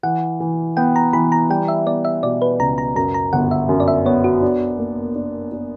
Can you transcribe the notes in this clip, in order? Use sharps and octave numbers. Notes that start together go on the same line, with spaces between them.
E3 F#5
E3
B3 G5
A#5
E3 B5
A#5
G3 G5
E5
B3 D5
E5
B2 D5
B4
C#2 A#5
A#5
F#2 A#5
A#5
G1 F#5
E5
F#2
D5
E5
B3 C#5
F#4
D4
A#3
D4
D4